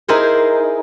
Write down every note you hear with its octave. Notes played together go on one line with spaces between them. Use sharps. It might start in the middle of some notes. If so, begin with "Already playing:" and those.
D#4 E4 G#4 A#4 C5